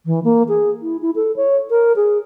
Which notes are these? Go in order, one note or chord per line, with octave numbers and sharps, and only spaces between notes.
E3
A#3
G#4
E4
E4
A4
C#5
A#4
G#4